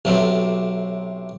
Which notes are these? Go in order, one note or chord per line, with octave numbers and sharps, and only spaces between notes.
B1 C3 F#3 A3 C4